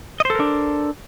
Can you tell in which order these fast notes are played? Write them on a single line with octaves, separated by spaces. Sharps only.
D#5 C5 A4 A#4 D4